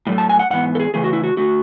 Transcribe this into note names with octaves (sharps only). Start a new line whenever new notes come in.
A2 F#3 A3
A5
G#5
F#5
G#2 E3 B3 F#5
A4
G#4
C#3 E3 A3 G#4
F#4
E4
F#4
D3 A3 F#4